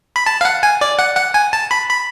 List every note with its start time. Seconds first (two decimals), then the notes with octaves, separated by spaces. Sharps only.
0.16 B5
0.26 A5
0.41 F5
0.45 F#5
0.63 G#5
0.81 D5
0.99 F#5
1.16 F#5
1.34 G#5
1.53 A5
1.71 B5
1.89 B5